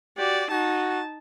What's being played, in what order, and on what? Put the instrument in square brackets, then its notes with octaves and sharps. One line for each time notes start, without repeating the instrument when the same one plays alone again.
[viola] F#4 D5 [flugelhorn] G4
[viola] D#4 A5 [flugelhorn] F#4